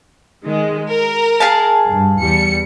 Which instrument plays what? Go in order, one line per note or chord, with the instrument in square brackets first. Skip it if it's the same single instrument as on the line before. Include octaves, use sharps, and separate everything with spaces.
[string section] D#3 G#3
A#4
[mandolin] G#4 F5 A5
[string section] G2
E2 G3 C#7